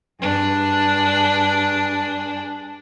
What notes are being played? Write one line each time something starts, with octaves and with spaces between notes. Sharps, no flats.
G2 D4 G#4